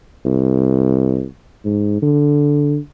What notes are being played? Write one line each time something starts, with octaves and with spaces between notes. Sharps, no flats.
C2
G#2
D3